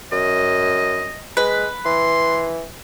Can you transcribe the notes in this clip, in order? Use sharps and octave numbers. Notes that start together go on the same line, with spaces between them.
F#2 D#5
G#3 B4
E3 C6